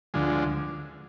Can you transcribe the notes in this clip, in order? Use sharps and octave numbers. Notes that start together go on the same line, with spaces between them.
D2 D3 F3 G#3